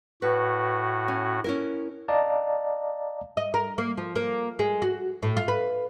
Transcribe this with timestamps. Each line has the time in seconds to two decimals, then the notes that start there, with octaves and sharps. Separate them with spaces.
0.22 A2 F#4 B4
1.08 C#4
1.44 C#4 E4 A#4
2.08 D5 D#5 F5 A5 A#5
3.37 D#5
3.54 A#4
3.78 A#3
3.97 F3
4.16 A#3
4.59 G#3
4.82 F#4
5.23 A2
5.37 F4
5.48 B4